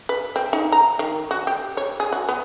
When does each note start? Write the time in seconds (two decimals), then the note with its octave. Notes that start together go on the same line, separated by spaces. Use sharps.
0.09 B4
0.36 C4
0.53 D#4
0.72 A#5
0.99 D#3
1.31 F#4
1.47 G4
1.77 C#5
2.00 G#4
2.13 F#4
2.29 B3